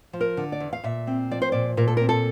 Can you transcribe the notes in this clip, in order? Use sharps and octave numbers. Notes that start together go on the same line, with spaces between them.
F3
A#4
D3
D5
E2
F5
A#2 E5
C4
F3 D5
C5
A#2 D5
A#2 A#4
A4
A#4
C4
A4